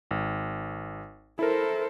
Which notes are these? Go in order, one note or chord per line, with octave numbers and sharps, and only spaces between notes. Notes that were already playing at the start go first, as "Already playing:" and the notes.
G#1
E4 A4 A#4 C5